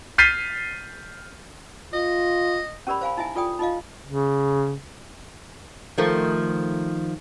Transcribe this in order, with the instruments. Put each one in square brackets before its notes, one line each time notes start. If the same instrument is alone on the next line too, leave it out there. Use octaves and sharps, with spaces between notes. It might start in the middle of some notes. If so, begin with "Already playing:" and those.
[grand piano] F6 G6 A6 B6 C7 D#7
[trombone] F4 [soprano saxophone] D#5
[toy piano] C#4 G4 A#4 D5 B5
C5 F5 G#5 B5
D#4 E4 E5 G#5
F4 A4 D5 G5 D#6
D#4 F4 D#5 F5
[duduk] C#3
[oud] D#3 F3 A3